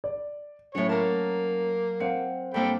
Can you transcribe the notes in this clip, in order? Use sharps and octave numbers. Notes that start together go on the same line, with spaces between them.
D5
A2 F#3 C#4 C#5
A#3 A#4 A5
C4 F5 F#5 C#7
G2 A#3 C4 A4 G5 B5